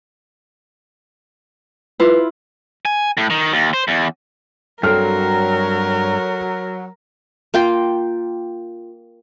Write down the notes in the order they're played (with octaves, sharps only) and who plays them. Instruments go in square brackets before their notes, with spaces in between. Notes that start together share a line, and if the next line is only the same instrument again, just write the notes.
[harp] E4 F4 [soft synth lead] B4
[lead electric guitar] G#5
A2
D#3
D#2
C5
E2
[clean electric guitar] G2 C4 [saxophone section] F#3 [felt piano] A4 F6 [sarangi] A#4
[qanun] A#3 F4 G5